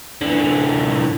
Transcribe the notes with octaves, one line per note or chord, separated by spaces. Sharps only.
D3 E3